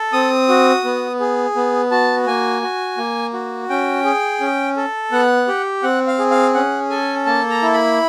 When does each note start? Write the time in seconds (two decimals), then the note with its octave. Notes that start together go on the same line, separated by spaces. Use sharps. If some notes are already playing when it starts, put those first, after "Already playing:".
Already playing: A4
0.13 C4 D#6
0.49 F#4
0.85 B3
1.20 G#4
1.55 B3
1.91 F#4 A5
2.26 A#3 G#5
2.62 F#4
2.97 A#3
3.33 F#4
3.70 C#4 G5
4.04 G#4
4.40 C#4
4.77 A4
5.12 B3 F#5
5.48 G4
5.83 C4 F#5
6.07 F5
6.19 G#4
6.31 F5
6.55 C#4 F#5
6.90 A4 G#5
7.26 A#3 A5
7.50 A#5
7.62 E4
7.74 B5